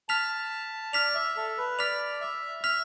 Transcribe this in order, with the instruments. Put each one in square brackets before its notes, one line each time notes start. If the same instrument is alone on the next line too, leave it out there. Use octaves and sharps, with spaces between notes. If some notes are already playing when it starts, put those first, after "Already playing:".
[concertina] A5 [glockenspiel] F6 B6 F7
[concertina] D5 [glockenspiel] F6 B6 F7
[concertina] E5
A4
B4
[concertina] D5 [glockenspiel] F6 B6 F7
[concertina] E5
[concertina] E5 [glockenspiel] F6 B6 F7